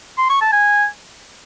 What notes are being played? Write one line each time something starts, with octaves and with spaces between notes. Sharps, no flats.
C6
C#6
A5
G#5